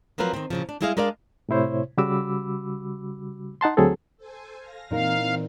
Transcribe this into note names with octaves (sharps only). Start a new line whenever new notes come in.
F3 F#3 C4 F4 A#4 B4
D#3 C4
A#2 C#3 F3
D4
G3 G#3 E4 G#4 D#5 F5
G#3 D4 A#4 D5 D#5 F5
A2 C3 E4 C5 C#5
C#3 G3 F#4 B5 D6 E6
D#4 F#5 A5 C6
D2 F#3 C4 G#4 A4
A4 C5 G#5
F5 A#6
A#2 E3 C4 D#4 A#4 F5